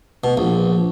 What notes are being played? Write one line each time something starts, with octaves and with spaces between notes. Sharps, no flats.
B2
A#1